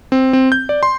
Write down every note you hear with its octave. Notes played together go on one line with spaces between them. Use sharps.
C4
C4
G6
D5
C6